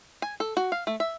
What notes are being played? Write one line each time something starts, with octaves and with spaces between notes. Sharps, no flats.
G#5
A4
F#4
F5
A3
E5